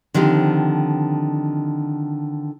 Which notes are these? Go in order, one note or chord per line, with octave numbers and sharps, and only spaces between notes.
D3 D#3 F3 C4 G4